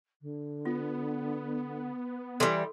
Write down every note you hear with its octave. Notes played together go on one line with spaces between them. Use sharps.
D3
B3 F4
E3 G3 A4 C6 D6